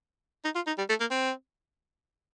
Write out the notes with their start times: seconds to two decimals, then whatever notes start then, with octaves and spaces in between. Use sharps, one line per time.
0.45 D#4
0.55 F4
0.67 D#4
0.78 G3
0.89 A3
1.00 A#3
1.11 C4